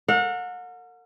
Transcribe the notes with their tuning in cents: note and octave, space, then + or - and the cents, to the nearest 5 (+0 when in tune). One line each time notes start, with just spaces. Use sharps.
A#4 -40 F#5 -35